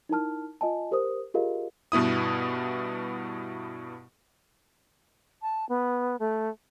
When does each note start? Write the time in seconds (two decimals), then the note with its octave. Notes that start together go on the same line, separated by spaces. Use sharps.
0.09 D#4 E4 A#4 A5 F6
0.61 F4 D#5 G#5 A5
0.91 G4 A#4 C5 D#6
1.34 F4 G4 G#4 A#4 D#5 F5
1.92 G2 B2 B3 E4 D#6
5.42 A5
5.69 B3
6.19 A3